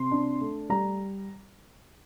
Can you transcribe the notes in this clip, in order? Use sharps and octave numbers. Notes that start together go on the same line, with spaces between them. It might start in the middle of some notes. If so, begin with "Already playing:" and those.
Already playing: C3 C6
D4
A3
G3 A#5